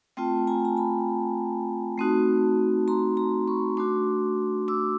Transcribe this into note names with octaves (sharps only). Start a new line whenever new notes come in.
A3 C4 F4 G5 A5
G#5 A#5
A#5
A5 B5
A3 C4 D#4 F#4
A#5 C6
A#5 C6
B5 C#6
A3 D4 F#4 C6 D6
D6 E6